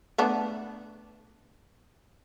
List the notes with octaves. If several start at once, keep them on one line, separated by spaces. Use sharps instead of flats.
A3 B3 D4